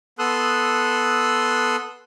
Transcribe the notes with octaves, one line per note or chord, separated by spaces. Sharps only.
B3 A4 C6 D#6 E6 F#6